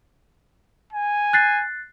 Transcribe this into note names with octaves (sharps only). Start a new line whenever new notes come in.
G#5
F#6 A6 C7